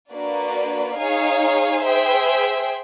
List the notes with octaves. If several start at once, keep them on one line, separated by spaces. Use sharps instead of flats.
A#3 D4 F#4 B4 D5
D#4 G#4 C#5 F5 G#5
G#4 C5 E5 G5